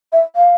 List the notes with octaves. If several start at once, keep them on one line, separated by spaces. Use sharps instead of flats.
E5
F5